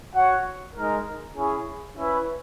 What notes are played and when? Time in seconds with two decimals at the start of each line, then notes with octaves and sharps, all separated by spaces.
0.14 F#4 C#5 F#5
0.75 G#3 D#4 A#4
1.35 C#4 E4 G#4
1.97 C#4 E4 B4